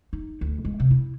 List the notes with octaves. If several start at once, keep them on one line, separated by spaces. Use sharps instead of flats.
D#4
D2
G#3
C3
E4